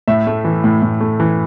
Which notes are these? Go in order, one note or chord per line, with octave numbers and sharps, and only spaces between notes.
A2 E5
A3
E3
A2
A2
A3
E3